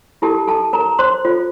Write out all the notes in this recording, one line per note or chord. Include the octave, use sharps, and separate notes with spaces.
E4 G4 A4 A#4 A5
A4 A5
A#4 A#5
C5 C6
F4 A4 C5